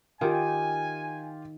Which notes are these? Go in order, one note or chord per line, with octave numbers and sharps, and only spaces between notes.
D#3 F4 G4 G5 G#5